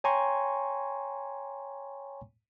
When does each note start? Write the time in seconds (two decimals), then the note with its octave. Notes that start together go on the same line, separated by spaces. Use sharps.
0.04 C#5 G5 G#5 A#5 C6 C#6